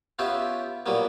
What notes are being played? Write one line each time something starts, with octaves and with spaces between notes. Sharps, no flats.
B3 C#4 F4 G4 E5
A#2 F#3 G3 A#3 B3